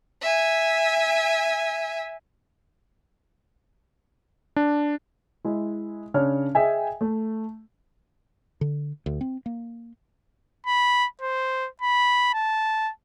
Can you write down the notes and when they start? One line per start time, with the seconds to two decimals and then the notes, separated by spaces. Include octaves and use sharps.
0.21 E5 G#5
4.56 D4
5.45 G#3 E4
6.14 C#3 D4 C#5 F6
6.55 G#4 D#5 E5 G5 G#5
7.01 A3
8.61 D3
9.06 D2
9.21 C4
9.46 A#3
10.67 B5
11.21 C5
11.82 B5
12.34 A5